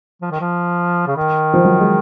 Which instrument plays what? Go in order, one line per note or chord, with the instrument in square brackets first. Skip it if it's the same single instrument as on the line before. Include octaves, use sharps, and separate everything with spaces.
[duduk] F3
D#3
F3
C#3
D#3
[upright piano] F3
F#3
G#3